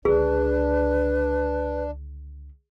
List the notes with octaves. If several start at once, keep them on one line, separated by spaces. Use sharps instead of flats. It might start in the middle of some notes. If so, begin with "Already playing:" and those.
C#2 D3 D4 G#4 B4